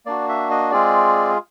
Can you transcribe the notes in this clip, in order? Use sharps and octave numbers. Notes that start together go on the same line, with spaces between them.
A#3 D4 F#4 D5
E5
D#5
G#3 C4 F4 G#4 D5